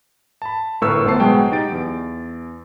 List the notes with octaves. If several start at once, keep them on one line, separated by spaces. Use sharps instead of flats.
A5 B5
G1 A2 A#4 B4 C#6 E6
G1 B3 C5 A5 C7
B2 F#3 G#3 G5
D#4 G4 A6 D7
E2